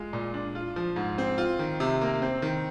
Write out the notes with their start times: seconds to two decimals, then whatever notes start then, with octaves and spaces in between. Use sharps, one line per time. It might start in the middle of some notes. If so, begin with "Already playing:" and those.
Already playing: G#3 F4
0.13 A#2
0.34 D4
0.55 F4
0.76 F3
0.96 G#2
1.18 C4
1.38 F4
1.59 D#3
1.80 C3
2.01 A#3
2.22 C4
2.42 D#3